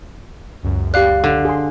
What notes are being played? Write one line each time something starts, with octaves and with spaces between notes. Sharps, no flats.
C#2 F#2
G4 D5 F5 F#6
D3
G#4 C6